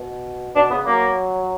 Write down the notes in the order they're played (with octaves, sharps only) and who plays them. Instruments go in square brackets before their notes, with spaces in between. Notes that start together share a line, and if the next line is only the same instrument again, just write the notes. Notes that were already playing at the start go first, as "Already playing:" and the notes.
Already playing: [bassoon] B2
[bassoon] B2 [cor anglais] D4
[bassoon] C#3 [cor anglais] B3
[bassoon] F#3 [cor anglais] A#3